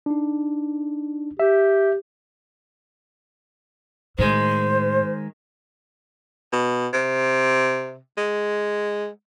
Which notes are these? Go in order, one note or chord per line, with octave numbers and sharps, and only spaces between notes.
D4 D#4
G4 E5
A2 D#3 G#3 C5
B2
C3
G#3